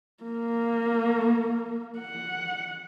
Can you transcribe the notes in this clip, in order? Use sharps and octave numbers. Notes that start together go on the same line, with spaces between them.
A#3
F#5